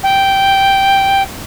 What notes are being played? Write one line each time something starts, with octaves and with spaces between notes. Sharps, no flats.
G5